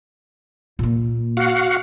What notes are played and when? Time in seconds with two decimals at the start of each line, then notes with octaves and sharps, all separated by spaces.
0.79 A#2 A#3
1.37 F#4 F5 F#5